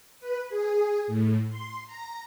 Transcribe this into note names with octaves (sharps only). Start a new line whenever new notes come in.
B4
G#4
A2
C6
A#5